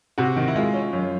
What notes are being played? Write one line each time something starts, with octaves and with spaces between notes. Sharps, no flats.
C3 F#4
D#3
E4
G#3 F4
C#4
F#2